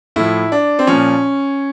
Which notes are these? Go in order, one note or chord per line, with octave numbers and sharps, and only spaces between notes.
A2 F3 E4
D4
C4
A#2 F3 C#4